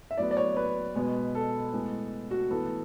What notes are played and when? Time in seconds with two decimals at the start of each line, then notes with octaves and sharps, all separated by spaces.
0.11 E5
0.17 A2 F#3 B3 D5
0.31 D5
0.37 C#5
0.56 B4
0.95 B2 G#3 B3
1.35 A4
1.73 A2 G#3 B3
2.31 F#4
2.51 A2 E3 B3 A4